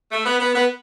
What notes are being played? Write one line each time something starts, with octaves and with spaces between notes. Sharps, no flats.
A3
B3
B3
B3